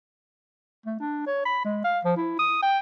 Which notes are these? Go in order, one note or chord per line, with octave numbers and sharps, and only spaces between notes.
A3
D4
C#5
B5
G#3
F5
F3
E4
D#6
G5